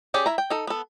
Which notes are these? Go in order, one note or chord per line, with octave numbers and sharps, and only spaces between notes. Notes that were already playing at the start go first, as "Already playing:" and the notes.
C#4 G4 G#4 D5
E4 E5 A#5
G5
D#4 A4
B3 A4